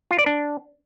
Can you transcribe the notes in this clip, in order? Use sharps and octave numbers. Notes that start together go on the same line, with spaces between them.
F4
D5
D4